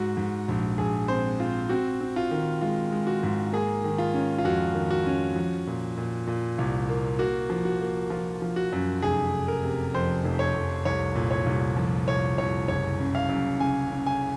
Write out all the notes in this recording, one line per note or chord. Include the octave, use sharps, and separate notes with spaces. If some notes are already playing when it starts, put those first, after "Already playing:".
Already playing: G#2 F#4
G#2
A#1
A#1 G#4
C4 C5
C4 F4
C4 F#4
C4
F4
D#3
G#3 F4
G#3
F#4
G#2
A#3 G#4
D#3
F4
C#4
F4
F2 F#4
D#3
F#4
C#4
F3
A#2
A#2
A#2
C2
A#3
A#3 F#4
F3
F#4
A#3
F3 F4
F3
F#4
F#2
F1 G#4
F1
A#4
C3
F2 C5
F1
C#5
F1
C2 C#5
A#2
C#5
C2
F3
C2 C#5
C2 C#5
F#1 C#5
C#3
F5
F#2
C#3 G#5
C#3
G#5